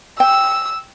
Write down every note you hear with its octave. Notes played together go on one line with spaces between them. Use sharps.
G5 E6